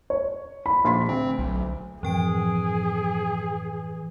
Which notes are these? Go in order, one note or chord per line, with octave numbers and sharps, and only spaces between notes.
C#5
B5
A#1 C6 B6
D2 C4
B1
F#2 A2 E3 F3 C4 G#4 G5 D7